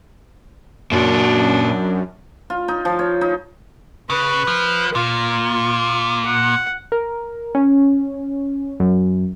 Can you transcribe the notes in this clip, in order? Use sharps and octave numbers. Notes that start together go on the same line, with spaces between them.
F#2 A#2 D4 F#4
F4
D#4
F3
C#5
D#4
C#3 B4
F3
A#2 F4
F#5
A#4
C#4
F#2